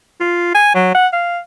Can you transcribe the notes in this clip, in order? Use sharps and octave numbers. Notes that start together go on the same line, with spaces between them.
F4
G#5
F#3
F#5
F5